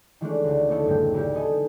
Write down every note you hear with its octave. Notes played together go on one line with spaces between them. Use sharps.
D#3 E3 G#3 A3 C#4 D4
C#2 D3
A#3 B3 C#4 D#4 E4 A4
F#1 A2 G#3 G5
D2 E4 G4
B3 D#4 A4 D#5 G#5